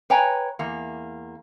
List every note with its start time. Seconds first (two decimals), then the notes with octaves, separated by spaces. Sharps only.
0.10 B4 C#5 G5 G#5 A#5
0.59 E2 A#3